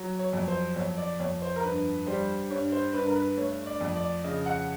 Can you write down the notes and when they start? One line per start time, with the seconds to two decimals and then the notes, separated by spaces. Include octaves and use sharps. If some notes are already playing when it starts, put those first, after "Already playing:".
Already playing: F#3
0.19 C#5
0.33 F2
0.48 C5
0.76 F2 C#5
0.98 D5
1.20 F2 C#5
1.42 C5
1.56 A#4
1.63 G2 B4
2.07 G3 C5
2.50 G2 C#5
2.72 C5
2.93 G2 B4
3.06 A#4
3.16 B4
3.37 A3 C#5
3.66 D5
3.81 F2
3.96 D5
4.24 C#3 D#5
4.46 F#5